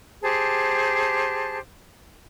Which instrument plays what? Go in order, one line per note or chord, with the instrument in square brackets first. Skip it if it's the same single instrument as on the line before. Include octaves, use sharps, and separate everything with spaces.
[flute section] G4 G#4 C5 A5